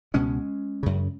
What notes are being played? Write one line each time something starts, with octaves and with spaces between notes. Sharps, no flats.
C#2 B2 G#3 C#4
F#2 C#3